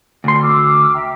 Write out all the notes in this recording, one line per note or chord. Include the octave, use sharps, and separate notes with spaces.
D2 C6
D6 E6 F6
E5 G5 A#5